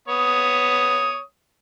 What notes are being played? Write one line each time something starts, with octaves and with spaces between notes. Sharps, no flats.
B3 C#5 D#6